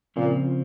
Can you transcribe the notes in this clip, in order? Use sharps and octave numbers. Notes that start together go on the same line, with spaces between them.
A#2 C#3 F3 C4